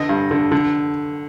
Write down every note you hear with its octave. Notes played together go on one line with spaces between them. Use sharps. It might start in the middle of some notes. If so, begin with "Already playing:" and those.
Already playing: D3 D#5
G2
D3
D3